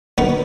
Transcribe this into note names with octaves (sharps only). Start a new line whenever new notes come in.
F#2 D#3 B3 B4